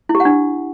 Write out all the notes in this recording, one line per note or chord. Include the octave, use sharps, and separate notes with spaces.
E4
G4
F#5
D4